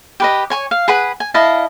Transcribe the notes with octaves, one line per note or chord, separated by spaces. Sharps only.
G4 B4 D#5
C#5 G#5 C#6
F5
G#4 B4 F#5 B5
G#5
E4 D#5 F5 A5